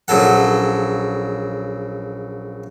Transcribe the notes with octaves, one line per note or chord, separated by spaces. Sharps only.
A#1 C#3 F#3 A4 F#5